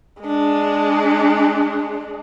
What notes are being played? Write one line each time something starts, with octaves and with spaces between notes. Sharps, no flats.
G#3 D4